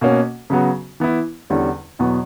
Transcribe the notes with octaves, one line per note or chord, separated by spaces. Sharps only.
B2 A#3 C#4 F#4
C#3 F#3 B3 F#4
E3 B3 E4
E2 D3 G3 C#4
E2 B2 F#3 B3